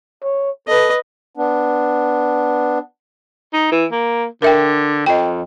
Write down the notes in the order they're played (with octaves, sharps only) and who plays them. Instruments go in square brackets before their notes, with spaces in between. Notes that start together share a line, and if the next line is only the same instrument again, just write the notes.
[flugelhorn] C#5
[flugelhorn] A4 [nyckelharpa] B4 D#5
[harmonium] B3 D4
[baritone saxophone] D#4
E3
A#3
[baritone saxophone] D3 [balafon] A#4 E5 G5
[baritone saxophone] F2 [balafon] D#5 G5